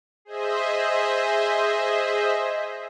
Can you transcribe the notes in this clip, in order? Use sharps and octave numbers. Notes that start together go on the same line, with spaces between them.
G#4 C5 D#5 E5